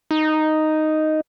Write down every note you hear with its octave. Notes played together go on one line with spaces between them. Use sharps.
D#4